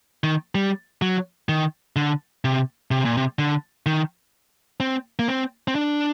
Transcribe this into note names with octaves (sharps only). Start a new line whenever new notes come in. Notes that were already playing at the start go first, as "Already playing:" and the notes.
D#3
G3
F#3
D#3
D3
C3
C3
A#2
C3
D3
D#3
C4
A#3
C4
C4
D4